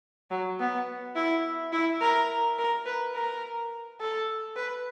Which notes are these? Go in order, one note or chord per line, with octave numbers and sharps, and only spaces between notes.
F#3
B3
E4
E4
A#4
A#4
B4
A#4
A4
B4